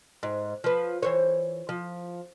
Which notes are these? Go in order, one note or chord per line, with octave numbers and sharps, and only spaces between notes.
G#2
F3 B4
E3 C5 C#5
F3